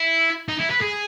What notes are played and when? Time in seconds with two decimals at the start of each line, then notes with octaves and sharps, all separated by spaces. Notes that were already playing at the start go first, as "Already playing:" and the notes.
Already playing: E4
0.49 D#4
0.60 E4
0.71 B4
0.82 G#4